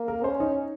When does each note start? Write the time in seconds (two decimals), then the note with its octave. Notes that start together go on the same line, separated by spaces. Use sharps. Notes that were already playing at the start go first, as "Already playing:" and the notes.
Already playing: A#3
0.08 A#4
0.24 C#4 C5
0.40 D#4